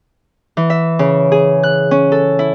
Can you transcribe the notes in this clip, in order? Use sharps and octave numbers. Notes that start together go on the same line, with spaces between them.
E3
E5
C#3
G#4
F#6
C#4
A4
E4